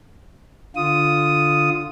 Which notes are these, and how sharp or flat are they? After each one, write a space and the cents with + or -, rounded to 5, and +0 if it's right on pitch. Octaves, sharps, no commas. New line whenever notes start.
D3 +5 F4 +0 D#6 +0